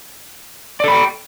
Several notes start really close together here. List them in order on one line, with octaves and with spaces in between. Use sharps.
D5 A4 B5 G5